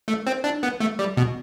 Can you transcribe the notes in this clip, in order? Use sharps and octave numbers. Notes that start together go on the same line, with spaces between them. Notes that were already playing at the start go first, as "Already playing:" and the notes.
A3
C4
D4
B3
A3
G3
B2